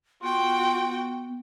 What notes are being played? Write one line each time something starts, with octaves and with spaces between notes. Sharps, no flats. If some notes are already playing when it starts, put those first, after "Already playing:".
B3 F4 F#4 G5